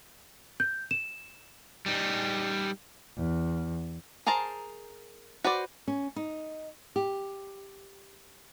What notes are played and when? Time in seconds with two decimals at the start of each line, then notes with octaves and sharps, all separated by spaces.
0.60 G6
0.91 E7
1.86 G3 D#4
3.17 E2
4.26 G#4 A#4 C5 A5 A#5
5.44 F#4 B4 C5 D5
5.88 C#4
6.16 D#4
6.96 G4